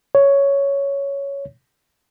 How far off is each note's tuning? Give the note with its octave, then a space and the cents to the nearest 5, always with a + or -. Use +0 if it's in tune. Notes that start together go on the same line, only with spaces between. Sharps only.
C#5 +5